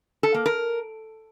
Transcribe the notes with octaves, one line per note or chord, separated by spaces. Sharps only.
A4
A#3
A#4